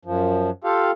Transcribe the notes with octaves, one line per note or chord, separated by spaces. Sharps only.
F#2 F3
F4 G4 A4 F5